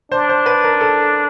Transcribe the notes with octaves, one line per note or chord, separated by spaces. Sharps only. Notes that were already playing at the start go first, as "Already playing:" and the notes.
D4 C5
C5
B4
A#4
A4